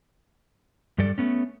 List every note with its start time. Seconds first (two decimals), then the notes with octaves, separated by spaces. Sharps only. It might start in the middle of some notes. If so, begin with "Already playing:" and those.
0.98 G2 G3 A4 D5
1.18 A3 B3 C#4